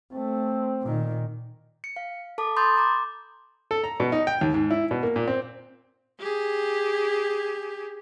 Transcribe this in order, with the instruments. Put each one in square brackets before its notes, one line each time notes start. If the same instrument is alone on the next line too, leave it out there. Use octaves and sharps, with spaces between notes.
[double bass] A3 [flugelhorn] C4
[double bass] A#2 D#3
[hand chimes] C#7
F5
A4 A5 D6
B5 C6 D#6 G6 A6
A#5 D6
[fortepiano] A4
A#5
B2
D#4
G5
D#2
G#2
E4
B2
A#3
A#2
C4
[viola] G4 G#4